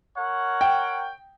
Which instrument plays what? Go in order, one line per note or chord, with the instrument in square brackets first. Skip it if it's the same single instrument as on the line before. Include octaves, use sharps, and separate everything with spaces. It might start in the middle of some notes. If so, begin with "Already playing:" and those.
[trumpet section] A#4 C#5 F#5
[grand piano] G5